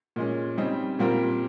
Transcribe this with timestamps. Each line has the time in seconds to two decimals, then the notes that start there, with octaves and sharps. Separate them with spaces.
0.16 A#2 G#3 C#4
0.58 C#3 G3 C4 D#4
0.99 A#2 G3 C4 F4 A#4